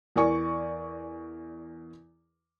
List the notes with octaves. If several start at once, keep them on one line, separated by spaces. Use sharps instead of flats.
E2 A#4 D5 G#5 C#6